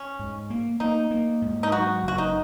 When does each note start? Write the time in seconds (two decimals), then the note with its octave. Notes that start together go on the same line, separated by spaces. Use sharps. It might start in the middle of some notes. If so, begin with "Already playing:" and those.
Already playing: C#4
0.19 G#2
0.50 A#3
0.80 A#3 D#4
1.11 A#3
1.42 G#2
1.63 D#4
1.72 F#3 F#4
2.03 F#1 F#4
2.18 D#4